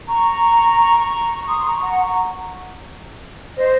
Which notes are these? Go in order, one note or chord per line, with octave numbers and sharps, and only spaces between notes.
A#5 C#6
C6 D#6
C6
A#5 C#6
C6
F#5 A#5
A#5 C#6
C5 D#5